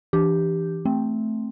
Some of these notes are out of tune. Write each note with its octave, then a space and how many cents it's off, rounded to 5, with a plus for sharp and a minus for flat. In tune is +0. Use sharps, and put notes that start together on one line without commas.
E3 +0 D4 +0 G4 +0
A3 +0 C4 +0